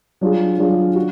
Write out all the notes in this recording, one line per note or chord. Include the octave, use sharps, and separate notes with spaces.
F#3 D4 F4 G#4
F#3 D4 F4 G#4
F#4